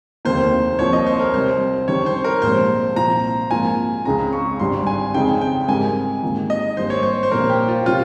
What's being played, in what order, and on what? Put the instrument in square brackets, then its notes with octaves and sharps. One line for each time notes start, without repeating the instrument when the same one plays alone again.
[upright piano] F1 D#2 D#3 A#3 [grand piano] C5
[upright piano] C2 C3 F3 A#3 [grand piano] C#5
[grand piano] D#5
C5
A#4
[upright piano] C2 C3 G3 [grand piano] C5
[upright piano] F2 D#3 G3 C#4 [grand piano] C#5
[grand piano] C5
A#4
[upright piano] A#1 G#2 G3 [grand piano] C5
[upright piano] C2 A#2 F3 [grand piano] A#5
[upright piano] G#2 F3 A#3 F4 [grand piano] G#5
[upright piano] C#2 C#3 G#3 C4 [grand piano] A#5
[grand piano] C#6
[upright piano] G#1 G2 G3 [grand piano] C6
[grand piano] G#5
[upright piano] F2 C#3 G#3 D#4 G#4 [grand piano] G5
[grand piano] G5
[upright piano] G#2 G3 C4 G4 A#4 [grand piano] G#5
[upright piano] G#2 D#3 A#3 F4
[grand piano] D#5
[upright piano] G#1 G2 G3 A#3 [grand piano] C5
[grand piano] C#5
C5
C5
[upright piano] A#1 A#2 G3 [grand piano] A#4
[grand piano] G4
F4
[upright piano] C3 G3 C#4 [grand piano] F4